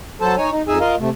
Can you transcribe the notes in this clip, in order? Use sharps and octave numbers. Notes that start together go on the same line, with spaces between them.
F#3 A4 C5 A5
D#4 C#5 G#5
D#4
F2 D#4 G#4 E5 G#5
F4 A#4 D#5 F5
C3 A3